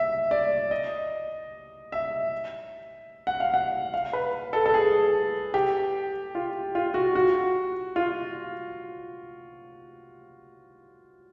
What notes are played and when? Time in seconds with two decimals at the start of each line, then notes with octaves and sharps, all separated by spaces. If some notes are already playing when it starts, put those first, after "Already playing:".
Already playing: E5
0.31 D5
0.71 D#5
1.92 E5
3.27 F#5
3.40 F5
3.54 F#5
3.94 F5
4.13 B4
4.53 A4
4.66 A4
4.74 G#4
5.54 G4
6.35 F4
6.75 F4
6.94 F#4
7.15 F#4
7.96 F4